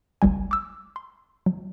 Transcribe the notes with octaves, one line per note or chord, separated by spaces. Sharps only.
G1 C#2 G3 G#5
D6 E6
C6
F#3